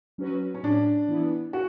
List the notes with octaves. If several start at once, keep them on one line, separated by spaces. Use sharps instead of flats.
F#3 C#4 F#4 B4
C#4
A2 D4
E3 B3 E4
F#4